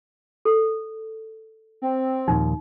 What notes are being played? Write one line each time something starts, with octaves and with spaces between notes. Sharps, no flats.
A4
C4
D#2 A#2 F3 D#4